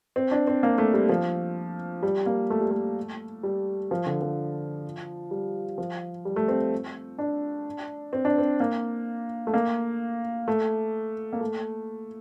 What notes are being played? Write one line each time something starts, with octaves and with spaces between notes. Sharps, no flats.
C4
D4
C4
A#3
A3
G3
F3
G3
A#3
A3
G3
A3
G3
F3
D3
F3
G3
F3
G3
A3
C4
D4
C4
D4
C4
A#3
A3
A#3
A3
A#3
A3